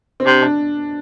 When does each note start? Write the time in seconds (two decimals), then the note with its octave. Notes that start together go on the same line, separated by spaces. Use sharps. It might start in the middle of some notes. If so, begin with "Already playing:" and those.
0.20 C4
0.26 C3 D4
0.42 D4